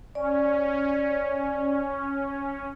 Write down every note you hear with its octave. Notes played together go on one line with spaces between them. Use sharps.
C#4 D5